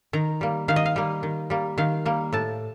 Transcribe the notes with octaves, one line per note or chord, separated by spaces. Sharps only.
D#3 A#5
G3 A#3
D#3 F5
D#5
F5
G3 A#3
D#3
G3 A#3
D#3 F5
G3 A#3
A2 A5